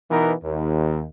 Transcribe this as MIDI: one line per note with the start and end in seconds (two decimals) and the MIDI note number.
0.10 0.33 47
0.10 0.33 52
0.10 0.33 59
0.10 0.33 63
0.10 0.33 70
0.44 1.06 39